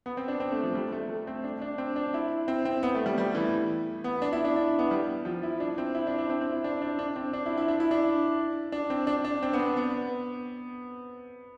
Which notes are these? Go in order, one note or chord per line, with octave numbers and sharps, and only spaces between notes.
B3
C4
D4
C4
A3
F3
G3
A3
A3
C4
D4
D4
C4
D4
E4
C4
C4
B3
A3
G3
G3
E3
B3
D4
E4
D4
D4
B3
G3
F3
E4
D4
C4
E4
D4
D4
C4
C4
E4
D4
D4
D4
C4
D4
E4
E4
D4
E4
D4
D4
C4
D4
D4
C4
B3
C4
B3